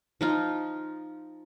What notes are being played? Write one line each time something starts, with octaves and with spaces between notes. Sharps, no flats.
F3 D#4 F4